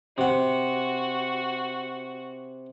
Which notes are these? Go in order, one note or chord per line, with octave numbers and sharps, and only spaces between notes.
C3 F#4 F#5